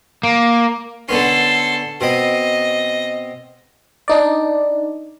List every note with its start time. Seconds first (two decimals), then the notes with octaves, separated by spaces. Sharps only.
0.23 A#3
1.09 D3 B3 C#4 A4 C6
2.01 B2 C4 D#5 B5
4.08 D4 D#4 D5